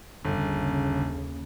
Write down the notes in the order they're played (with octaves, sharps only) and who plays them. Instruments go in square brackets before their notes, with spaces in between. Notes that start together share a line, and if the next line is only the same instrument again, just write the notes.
[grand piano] G1 [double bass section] D#2 C#3